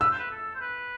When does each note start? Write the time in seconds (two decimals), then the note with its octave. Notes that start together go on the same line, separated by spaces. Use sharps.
0.01 B4 E6
0.10 C5
0.19 B4
0.31 A4
0.55 C5
0.61 B4